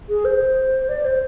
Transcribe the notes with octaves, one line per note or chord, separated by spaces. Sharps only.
G#4
C5
D5
C5